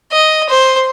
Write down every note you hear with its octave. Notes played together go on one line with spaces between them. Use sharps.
D#5
C5